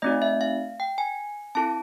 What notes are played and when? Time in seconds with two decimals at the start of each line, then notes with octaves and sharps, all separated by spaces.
0.02 A3 C4 D#4 F#4 D#5
0.22 E5
0.41 F5
0.80 G5
0.98 G#5
1.55 C4 E4 A4 A5